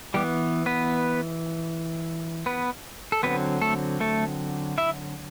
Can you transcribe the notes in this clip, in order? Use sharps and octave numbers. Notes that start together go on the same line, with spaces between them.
E3 G3 B3 G4
B3 B4
B3 B4
A4
D3 F#3 B3 C4 B4
A3 A4
A3 A4
E4 E5